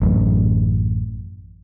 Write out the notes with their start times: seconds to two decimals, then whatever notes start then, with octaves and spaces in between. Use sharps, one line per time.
0.02 A1 F#2